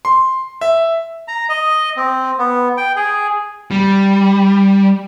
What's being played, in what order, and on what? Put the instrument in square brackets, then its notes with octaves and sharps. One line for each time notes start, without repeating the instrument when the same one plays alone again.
[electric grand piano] C6
E5
[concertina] A#5
D#5
C4
B3
G5
G#4
[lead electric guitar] G3